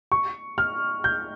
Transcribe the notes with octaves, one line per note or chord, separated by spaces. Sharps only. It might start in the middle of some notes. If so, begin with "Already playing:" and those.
C#6
F6
G6